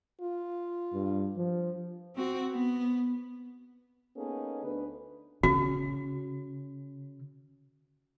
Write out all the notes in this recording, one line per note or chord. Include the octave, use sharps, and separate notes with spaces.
F4
G2
F3
C4 F#4
B3
A#3 B3 C#4 D#4 G#4 A4
D2 B4
C#3 F#4